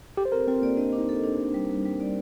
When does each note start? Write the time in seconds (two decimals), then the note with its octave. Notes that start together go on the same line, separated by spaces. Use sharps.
0.17 G4 A4
0.25 C5
0.32 C4 A#4
0.48 C4 F4
0.62 A#3 D5
0.77 D4 D#5
0.93 D4
0.98 D#4
1.09 A4
1.24 D4
1.38 A#4
1.54 G3
1.69 G3
1.85 G3
2.00 D5